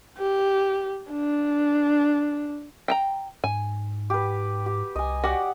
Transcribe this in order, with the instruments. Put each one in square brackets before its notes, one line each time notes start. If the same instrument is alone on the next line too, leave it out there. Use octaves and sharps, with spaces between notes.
[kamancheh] G4
D4
[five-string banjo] G5 A5 A#5
[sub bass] G#2 [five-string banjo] G#5
[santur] G4 B4
G4
[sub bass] C2 [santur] D#5 G#5
[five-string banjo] F#4 [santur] G4 D5 F#5